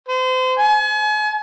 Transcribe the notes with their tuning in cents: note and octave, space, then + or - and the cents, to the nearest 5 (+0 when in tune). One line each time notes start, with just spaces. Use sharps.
C5 -35
G#5 +40